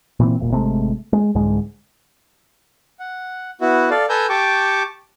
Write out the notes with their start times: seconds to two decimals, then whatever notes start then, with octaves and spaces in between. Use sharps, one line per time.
0.20 A#2 E3 C4
0.40 D#1 A#2
0.51 G#1 C3 G#3 A3
1.13 G#3
1.35 C2 G#2 D3 G#3
2.99 F#5
3.61 B3 E4 F#4
3.90 A4 D5 F5
4.09 A4 B4 G#5 A#5 E6 G6
4.29 G4 G5 A5 C#6 D6